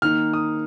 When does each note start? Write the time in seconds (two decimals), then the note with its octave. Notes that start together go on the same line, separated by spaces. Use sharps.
0.02 D#3 A#3 D#4 F6
0.33 D#6